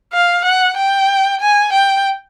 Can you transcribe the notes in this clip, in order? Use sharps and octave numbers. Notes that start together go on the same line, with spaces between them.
F5
F#5
G5
G#5
G5